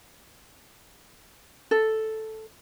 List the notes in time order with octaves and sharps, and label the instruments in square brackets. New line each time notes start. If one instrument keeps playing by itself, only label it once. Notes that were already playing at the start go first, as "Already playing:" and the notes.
[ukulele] A4